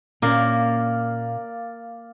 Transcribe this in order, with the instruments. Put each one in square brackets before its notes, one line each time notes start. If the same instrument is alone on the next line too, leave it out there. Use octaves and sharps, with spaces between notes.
[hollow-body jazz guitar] A#2 C#4 [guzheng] A#3 [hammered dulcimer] D5 F5